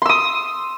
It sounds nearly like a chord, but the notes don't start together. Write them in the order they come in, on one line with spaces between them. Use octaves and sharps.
C6 E6 D#6